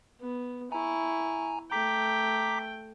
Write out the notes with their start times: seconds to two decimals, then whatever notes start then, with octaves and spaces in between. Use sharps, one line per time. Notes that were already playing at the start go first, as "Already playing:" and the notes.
0.21 B3
0.72 E4 G#5 A#5 C#6
1.71 A3 G5 A#5 D6 B6